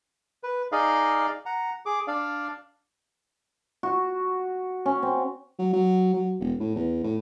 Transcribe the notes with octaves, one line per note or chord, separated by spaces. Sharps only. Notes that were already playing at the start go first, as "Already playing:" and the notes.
B4
D#4 G#4 D5 D#5 F5
F#5 A#5
G#4 D6
D4 D5 F5
F#4
C#4
C4
F#3
F#3
F#3
E1
A2
E2
A2